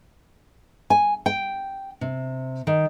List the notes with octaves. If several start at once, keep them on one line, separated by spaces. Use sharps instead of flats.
G#5
G5
C3
D#3